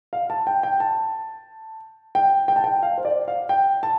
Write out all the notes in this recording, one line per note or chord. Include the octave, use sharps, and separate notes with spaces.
F5
A5
G5
G5
A5
G5
G5
A5
G5
F5
C5
D5
F5
G5
A5